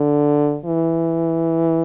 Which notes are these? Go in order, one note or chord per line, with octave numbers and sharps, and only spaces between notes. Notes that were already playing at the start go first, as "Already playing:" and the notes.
Already playing: D3
E3